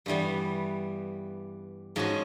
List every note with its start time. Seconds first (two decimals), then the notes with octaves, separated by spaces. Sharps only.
0.06 G2 E3 G3 B3
1.96 G#2 F3 G#3 C#4 F#4